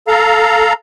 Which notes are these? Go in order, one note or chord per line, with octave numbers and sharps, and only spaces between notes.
A4 F5 A#5